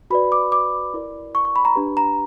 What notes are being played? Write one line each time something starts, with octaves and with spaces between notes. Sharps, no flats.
F#4 B4 D5 B5
D6
D6
E4 A#4 D5
C#6
C#6
B5
A#5
D4 G4 B4
A#5